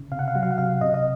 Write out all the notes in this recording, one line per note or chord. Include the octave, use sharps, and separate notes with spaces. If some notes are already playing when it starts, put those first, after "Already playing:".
Already playing: C#3
C3 F5
F#5
F5
F#3 F#5
F5
F#5
C3 F5
C3 D#5
D#5